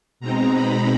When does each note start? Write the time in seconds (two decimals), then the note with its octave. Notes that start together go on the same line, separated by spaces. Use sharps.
0.20 B2 G#3 C4 D#4 A#5
0.52 B5